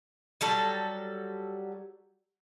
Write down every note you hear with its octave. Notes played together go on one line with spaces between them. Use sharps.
F#3 G3 A4